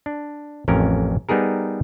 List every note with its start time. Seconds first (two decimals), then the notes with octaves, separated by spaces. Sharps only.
0.06 D4
0.68 A1 F2 C#4 A#4
1.29 G3 B3 D#4 G#4 A#4